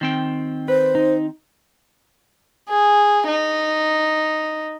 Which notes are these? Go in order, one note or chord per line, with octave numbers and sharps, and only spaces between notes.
D#3 C4 G5
B4 C5
D#4
G#4
D#4